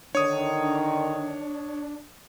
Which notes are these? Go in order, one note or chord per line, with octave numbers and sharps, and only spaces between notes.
D3 D#3 D4 C#5 D#6